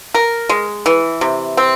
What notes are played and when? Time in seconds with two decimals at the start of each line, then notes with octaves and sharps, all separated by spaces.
0.14 A#4
0.49 G#3
0.86 E3
1.21 C3
1.57 C4